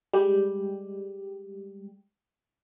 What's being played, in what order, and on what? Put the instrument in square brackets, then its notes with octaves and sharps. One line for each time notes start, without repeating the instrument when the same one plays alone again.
[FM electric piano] G3 G#3 G4